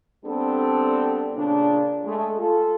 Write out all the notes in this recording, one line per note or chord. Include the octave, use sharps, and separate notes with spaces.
G3 B3 C4 D4 A4
A#2 C#3 D4
G#3 A3
F4 A4